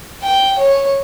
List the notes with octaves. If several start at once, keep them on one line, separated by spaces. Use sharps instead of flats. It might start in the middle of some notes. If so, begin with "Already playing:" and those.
G5
C#5